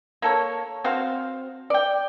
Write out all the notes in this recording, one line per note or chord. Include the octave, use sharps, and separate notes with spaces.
A#3 A4 C#5
C4 F#4 C5 F5
D5 G5